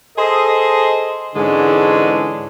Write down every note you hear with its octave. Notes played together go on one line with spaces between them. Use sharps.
G#4 A4 C5 D#5
G#2 D3 E3 G#3 C#4 D4